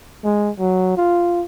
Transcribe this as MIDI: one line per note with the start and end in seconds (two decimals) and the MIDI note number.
0.24 0.51 56
0.59 0.93 54
0.97 1.45 65